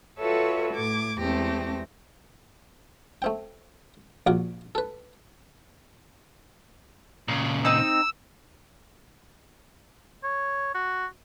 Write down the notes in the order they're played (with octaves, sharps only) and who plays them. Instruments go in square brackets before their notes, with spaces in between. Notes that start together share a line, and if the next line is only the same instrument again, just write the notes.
[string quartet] F4 F#4 A4 B4 C#5 E5
A2 D6 G#6
E2 G#3 A3 C4 G4 A#6
[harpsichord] A3 C4 G5
A#1 F4 F#4 D6
A4 B4
[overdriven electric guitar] A#2 C#3
[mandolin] C4 D#4 [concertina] E6
[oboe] C#5
F#4